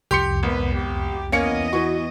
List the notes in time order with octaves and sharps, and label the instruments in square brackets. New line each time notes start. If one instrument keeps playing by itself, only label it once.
[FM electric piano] C2 F2 [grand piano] G4 C6 C#7
[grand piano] G#1 [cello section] B3 B4
[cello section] G4
[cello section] E2 B3 D#5 [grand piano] A#3 C#4 C#7
[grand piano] E3 C#6 [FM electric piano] F#4